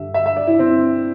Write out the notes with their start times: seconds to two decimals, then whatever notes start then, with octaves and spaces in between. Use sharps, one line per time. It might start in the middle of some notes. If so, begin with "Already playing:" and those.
Already playing: G2 D3 G3 E5
0.14 E5
0.26 E5
0.37 D5
0.47 E4
0.59 C4